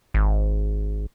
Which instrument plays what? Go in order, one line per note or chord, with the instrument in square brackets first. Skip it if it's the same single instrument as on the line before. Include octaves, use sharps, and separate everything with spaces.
[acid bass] G#1